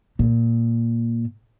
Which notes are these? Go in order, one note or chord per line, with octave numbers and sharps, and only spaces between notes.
A#2